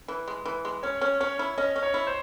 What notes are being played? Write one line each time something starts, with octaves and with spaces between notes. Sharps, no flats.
E3
G#3
E3
G#3
C#4 C#5
C#4
C#4 C#5
E4
C#4 D#5
C#4
C#5
E4
C5